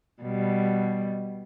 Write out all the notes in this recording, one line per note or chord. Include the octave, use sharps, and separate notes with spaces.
B2 G3